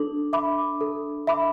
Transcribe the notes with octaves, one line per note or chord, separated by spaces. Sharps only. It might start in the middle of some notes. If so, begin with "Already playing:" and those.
Already playing: D4 A4
E5 B5 D6
A4
E5 B5 D6